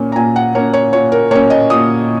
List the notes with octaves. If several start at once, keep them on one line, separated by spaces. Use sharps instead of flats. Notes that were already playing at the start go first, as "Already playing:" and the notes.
Already playing: A#2 A#3 C#4
A#5
A#2 G#5
F#5
A#3 C#4 C#5
C#5
A#2 C#5
A#4
A#3 C#4 C#5
D#5
A#2 D#6